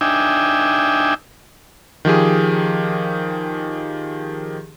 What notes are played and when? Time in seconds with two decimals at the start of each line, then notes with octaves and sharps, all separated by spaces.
0.01 D4 D#4 E5 G5 G#5
2.05 D#3 F3 G4 G#4